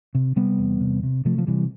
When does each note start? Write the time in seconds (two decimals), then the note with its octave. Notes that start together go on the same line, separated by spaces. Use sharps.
0.15 C3
0.36 C3 G3 B3
0.58 E2
0.80 C3
1.03 C3
1.25 C3 F3 A3
1.38 F3
1.47 C3 E3 G3